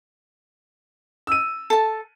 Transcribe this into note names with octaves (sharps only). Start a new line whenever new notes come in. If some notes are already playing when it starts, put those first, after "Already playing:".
E6 D#7
A4 A5